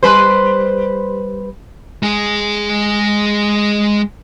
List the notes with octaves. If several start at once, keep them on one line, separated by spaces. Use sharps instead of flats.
G3 B4 C5
G#3 G#4